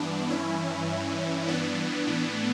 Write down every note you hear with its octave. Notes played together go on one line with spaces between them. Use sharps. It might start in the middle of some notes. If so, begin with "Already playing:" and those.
Already playing: G2 E3 B3 D4
C#4 E4
B3 D4
A2 E3